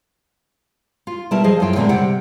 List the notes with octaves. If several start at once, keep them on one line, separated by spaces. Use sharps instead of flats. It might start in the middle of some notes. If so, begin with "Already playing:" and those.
F4
B2 G3 E4 A#4 A5
F3 G#4 D#5
F#2 E4 F4 G5
A#2 D3 G#3 C4 E4 A#4
C3 G3 F#5 G5